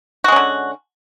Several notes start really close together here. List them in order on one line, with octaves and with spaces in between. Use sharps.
F#4 G#3 C#4 D3